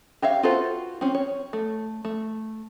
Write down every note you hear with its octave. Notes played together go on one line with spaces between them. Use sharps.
G4 C#5 E5 F5
F4 F#4 A4 B4 C5
C4 C#4
C#5
A3
A3